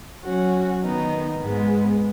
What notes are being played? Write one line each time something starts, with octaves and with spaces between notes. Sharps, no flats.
F#3 C#4 F#4
D#3 B3 D#4
G#2 G#3 B3